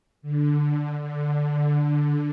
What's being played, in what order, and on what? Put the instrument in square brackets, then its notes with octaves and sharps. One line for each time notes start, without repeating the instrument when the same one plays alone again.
[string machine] D3
D3